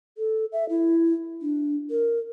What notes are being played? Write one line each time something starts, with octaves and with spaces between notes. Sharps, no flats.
A4
E5
E4
D4
A#4